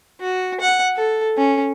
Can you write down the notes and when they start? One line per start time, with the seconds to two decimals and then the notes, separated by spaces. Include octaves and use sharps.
0.21 F#4
0.60 F#5
0.97 A4
1.38 C#4